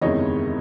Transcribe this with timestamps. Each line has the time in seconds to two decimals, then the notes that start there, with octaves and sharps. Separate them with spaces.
0.01 F#1 E2 C3 D#3 G#3 C#5 D#5